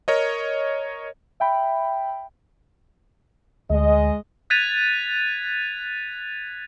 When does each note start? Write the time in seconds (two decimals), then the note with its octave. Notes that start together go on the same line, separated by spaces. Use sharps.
0.08 A#4 C#5 D#5
1.40 E5 G5 B5
3.70 D2 G#3 D#5
4.50 F#6 G#6 A6 B6 D#7 F7